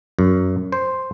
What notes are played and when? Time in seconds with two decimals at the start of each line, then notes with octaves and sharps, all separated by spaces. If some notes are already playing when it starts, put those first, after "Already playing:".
0.19 F#2
0.72 C5